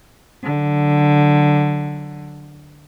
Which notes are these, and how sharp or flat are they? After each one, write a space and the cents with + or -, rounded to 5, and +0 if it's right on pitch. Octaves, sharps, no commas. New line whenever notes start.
D3 +0 F#3 +0